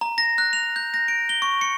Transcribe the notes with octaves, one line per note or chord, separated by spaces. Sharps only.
A#5
A#6
F#6
F7
G6
A#6
D7
G7
C#6
C#7